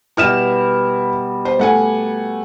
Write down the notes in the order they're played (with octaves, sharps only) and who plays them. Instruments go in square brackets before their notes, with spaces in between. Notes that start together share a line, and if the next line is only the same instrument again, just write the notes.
[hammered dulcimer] B2 G3 [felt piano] E4 F6 E7
[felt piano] C5
A3 F#5 G#5